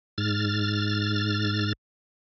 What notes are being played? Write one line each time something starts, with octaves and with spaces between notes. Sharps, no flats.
G#2 F6 A6